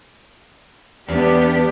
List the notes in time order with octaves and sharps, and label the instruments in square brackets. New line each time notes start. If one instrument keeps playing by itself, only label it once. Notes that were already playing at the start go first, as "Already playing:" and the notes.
[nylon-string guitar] E2 [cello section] B3 D4 G4